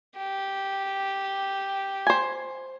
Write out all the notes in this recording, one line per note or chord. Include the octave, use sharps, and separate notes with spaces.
G4
C5 G#5